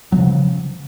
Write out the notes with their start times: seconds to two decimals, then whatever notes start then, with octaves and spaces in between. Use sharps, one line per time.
0.12 F#3
0.18 C#3 F3